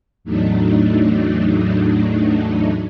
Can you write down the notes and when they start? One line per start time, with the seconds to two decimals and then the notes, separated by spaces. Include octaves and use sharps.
0.24 E2 A2 F#3 A3 D4 D#4